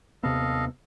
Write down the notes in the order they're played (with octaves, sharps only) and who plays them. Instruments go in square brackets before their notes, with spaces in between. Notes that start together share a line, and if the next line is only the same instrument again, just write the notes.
[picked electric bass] D#2 C3 B3 [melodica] A4 D#5 F5